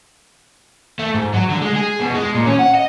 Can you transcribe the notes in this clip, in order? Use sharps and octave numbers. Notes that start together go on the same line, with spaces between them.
A3
G#2
F#3
D3
G#3
G#4
B2
G#3
A#2
C#4
F#5
D#5